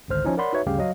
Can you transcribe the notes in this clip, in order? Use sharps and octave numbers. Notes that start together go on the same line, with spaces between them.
G#1 C#2 D3 C5 F6
F3 C#4 D#4 E4
A#4 C#5 D5 F#5 B5 C6
D#4 F#4 B4 C#5 E5
D2 G2 C#3 G3 G4 F5
F#3 D#5 F5